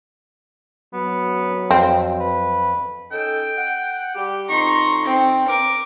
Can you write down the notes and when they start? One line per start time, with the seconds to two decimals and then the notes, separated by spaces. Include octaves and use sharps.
0.94 F#3 B3
1.71 F2 C4
2.20 B4
3.11 C#4 D#4 A4 G5
3.58 F#5
4.15 G3 G4
4.49 F2 D#4 A#5 C6 C#6
5.05 C4
5.48 A#4 D6